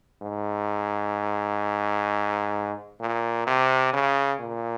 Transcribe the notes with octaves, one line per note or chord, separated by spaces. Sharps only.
G#2
A#2
C3
C#3
A#2